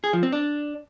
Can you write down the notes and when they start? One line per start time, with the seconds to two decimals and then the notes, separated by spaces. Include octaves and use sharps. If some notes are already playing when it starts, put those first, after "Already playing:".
0.04 G#4
0.13 F3
0.23 C4
0.32 D4